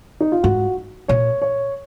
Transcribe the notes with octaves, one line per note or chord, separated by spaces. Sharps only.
D#4
F4
G#2 F#4
A#2 C#5
C#5